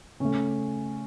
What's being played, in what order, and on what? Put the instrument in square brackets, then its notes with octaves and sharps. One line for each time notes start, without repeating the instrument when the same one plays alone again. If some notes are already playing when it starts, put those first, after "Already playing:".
[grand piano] C#3 A3 C#4